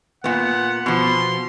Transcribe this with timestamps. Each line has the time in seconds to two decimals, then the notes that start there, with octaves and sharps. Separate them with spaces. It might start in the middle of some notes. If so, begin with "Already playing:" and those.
0.24 A#2 B3 F#5
0.86 B2 F3 C6